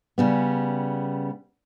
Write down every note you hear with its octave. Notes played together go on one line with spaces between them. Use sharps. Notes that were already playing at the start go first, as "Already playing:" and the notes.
C#3 G3 B3